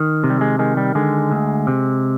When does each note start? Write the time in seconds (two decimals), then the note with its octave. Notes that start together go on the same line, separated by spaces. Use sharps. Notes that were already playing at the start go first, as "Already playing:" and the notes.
Already playing: D#3
0.24 C3
0.30 G3
0.41 G#3
0.59 D#3 G#3
0.77 G3
0.95 D3 G#3
1.31 D2
1.67 C3